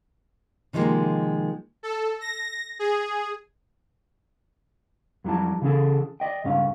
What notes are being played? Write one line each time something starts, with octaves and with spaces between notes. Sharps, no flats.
C3 D#3 F3 G3 G#3 A#3
A4
A#6
G#4
F2 F#3 G3 E4 A5
C#3 E3 C#4 G#4 A4
D5 D#5 G5
C#2 G2 C#4 F5